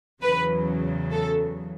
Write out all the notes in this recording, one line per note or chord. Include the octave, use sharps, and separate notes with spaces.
E2 C#3 F#3 B4
A4